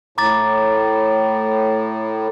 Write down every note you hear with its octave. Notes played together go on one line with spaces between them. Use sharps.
A2 A#5 D6 A6